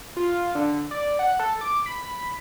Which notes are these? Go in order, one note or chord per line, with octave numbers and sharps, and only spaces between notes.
F4
D3
D5
F#5
A4
D6
B5